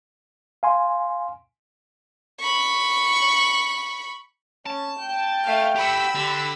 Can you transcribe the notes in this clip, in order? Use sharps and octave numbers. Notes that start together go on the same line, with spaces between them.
F5 G#5 C6
B5 C#6
C#4 A5
G5
A3 F5
G4 F#5 B5 E6
D3 G4